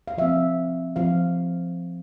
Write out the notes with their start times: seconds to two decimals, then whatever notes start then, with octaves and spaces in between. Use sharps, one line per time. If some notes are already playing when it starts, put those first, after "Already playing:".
0.08 F5
0.18 F3 C4 E5
0.96 F3 C4 F5